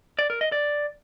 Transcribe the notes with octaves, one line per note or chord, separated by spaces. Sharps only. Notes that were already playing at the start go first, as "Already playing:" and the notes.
D5
A#4
D#5
D5